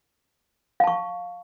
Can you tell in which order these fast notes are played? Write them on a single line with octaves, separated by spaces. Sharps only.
F5 A5 C#6